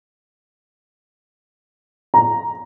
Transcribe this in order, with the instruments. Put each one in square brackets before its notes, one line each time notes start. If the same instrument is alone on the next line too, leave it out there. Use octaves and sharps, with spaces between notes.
[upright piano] A#5